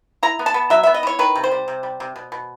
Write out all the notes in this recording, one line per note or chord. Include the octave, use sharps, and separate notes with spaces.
E4 A#5
B3
A5
B3
F#3 E5
B3 E5
D#5
E4 C#5
D#3 B4
C3
C5
G3
C3
G3
C3
B2
B2